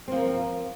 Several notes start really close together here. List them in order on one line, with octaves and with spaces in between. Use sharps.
C4 F3 A#3